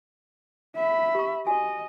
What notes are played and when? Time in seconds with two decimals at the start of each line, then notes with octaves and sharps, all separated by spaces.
0.76 E5 B5
1.15 G4 C#6
1.47 F#4 D#5 G#5